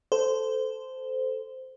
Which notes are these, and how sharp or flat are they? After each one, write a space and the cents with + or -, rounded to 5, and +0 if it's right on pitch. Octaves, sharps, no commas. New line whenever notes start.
A4 +0 C5 -15